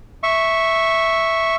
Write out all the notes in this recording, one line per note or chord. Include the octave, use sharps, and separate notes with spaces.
E5 C#6